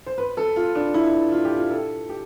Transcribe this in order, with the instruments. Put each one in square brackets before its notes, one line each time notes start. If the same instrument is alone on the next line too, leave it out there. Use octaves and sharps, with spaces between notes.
[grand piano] C5
B4
A4
F4
D4
E4
F4
G4
F4
A4
G4